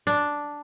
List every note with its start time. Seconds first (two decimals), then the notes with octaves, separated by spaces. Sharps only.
0.07 D4